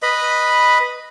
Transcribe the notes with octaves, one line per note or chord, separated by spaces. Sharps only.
B4 D#5 B5